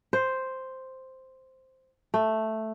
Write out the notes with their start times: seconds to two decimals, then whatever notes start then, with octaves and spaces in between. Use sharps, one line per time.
0.13 C5
2.14 A3